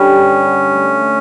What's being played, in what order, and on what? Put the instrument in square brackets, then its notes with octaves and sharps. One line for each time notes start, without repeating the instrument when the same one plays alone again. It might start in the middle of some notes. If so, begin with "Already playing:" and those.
Already playing: [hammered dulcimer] D3 G3 [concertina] C#4
[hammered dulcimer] G2
D3
A3
A3